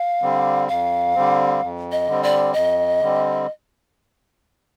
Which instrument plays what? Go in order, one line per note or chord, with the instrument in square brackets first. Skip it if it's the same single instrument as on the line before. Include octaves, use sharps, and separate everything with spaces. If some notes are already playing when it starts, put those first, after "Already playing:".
Already playing: [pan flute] F5
[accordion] D3 G3 C4
[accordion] F2 [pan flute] F5
[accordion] D3 G3 C4
F2
[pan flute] D#5
[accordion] D3 G3 C4
[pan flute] D5
[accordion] F2 [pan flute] D#5
[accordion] D3 G3 C4